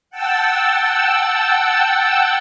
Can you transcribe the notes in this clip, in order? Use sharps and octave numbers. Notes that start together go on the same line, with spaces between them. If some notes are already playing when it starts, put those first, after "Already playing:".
F#5 G5 A5 E6